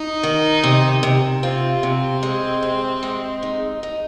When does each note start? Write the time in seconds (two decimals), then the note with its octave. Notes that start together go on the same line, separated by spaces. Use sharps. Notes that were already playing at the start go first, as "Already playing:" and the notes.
Already playing: D#4
0.23 D#3
0.64 C3
1.03 C3
1.43 C4 F4
1.83 C3
2.23 G#3
2.62 C3
3.03 G#3
3.43 D#4
3.83 D#4